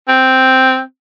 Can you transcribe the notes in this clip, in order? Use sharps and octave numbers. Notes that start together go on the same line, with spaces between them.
C4